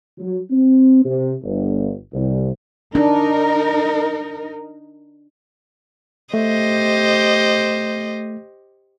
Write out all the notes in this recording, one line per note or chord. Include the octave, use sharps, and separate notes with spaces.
F#3
C4
C3
G1
C2
D4 D#4 A#4
A3 G4 C5 D#5